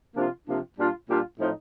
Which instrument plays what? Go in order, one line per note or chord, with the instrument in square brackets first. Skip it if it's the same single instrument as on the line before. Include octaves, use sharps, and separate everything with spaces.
[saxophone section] C3 F3 A#3 D4 F4
C3 F3 A#3 D4 F4
A#2 G3 D4 F4
A#2 G3 D4 F4
A2 F3 C4 D#4